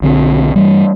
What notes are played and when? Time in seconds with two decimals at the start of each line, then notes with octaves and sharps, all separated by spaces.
0.02 B1 D3 C4
0.56 G2 E3 G3